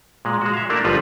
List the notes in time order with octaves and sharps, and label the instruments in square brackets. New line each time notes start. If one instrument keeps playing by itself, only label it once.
[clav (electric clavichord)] A#2 G#3
G#3 F#4
E5 F5
A3 A#3 D4 E4 A4 A#4
G1 F3 G3 F4 B4 A#5